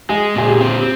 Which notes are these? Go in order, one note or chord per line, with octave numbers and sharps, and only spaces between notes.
G#3 G#4
A#2 G#4
G4
C4
G4